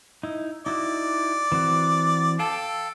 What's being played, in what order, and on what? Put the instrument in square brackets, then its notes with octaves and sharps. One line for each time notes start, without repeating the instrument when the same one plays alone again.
[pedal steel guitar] D#4 E4
[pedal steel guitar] D#4 E4 F#4 [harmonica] D5
[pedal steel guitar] E3 C4 F#4
[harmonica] A4 [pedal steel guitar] F5 G5 A5